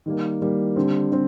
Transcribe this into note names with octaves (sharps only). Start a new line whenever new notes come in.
D#3 G3 A#3
D#3 G3 A#3
D3 G3 C4
D3 G3 C4